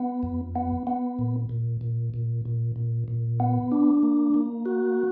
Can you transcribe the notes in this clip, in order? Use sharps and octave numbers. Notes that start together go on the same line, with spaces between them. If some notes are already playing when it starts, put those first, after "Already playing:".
Already playing: B3
F2
B3
B3
A#2
A#2
A#2
A#2
A#2
A#2
A#2
B3
D4
A#3
A#3
F#4